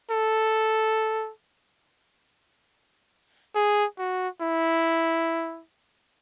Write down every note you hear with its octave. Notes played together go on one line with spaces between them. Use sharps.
A4
G#4
F#4
E4